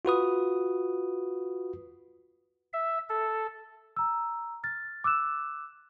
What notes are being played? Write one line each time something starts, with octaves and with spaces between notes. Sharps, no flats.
F4 F#4 B4 D#6
E5
A4
A#5 E6
F6 A6
D6 E6 F#6 E7